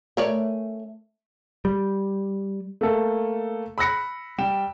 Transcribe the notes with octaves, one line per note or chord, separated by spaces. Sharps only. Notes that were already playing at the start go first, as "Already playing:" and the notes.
A3 C#4 A#4 C#5 D5
G3
A3 A#3 A4
B5 E6 F#6 A#6 C#7
G3 G5 E7